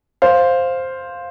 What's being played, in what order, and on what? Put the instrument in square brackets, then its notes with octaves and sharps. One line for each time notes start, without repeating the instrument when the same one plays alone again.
[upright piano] C5 F5